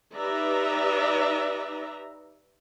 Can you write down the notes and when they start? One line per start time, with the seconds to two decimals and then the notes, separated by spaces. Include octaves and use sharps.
0.16 D#4 G4 B4 D5 E5 A#5